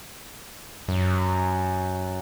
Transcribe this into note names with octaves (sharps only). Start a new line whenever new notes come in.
F#2